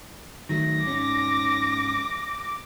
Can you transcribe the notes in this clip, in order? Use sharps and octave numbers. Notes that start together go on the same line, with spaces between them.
D#3 F#3 A3 A#6
G#2 C#4 D#4 D6